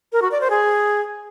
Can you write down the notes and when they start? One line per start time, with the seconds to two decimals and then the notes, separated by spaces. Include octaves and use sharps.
0.12 A#4
0.22 F#4
0.31 D5
0.41 C5
0.50 G#4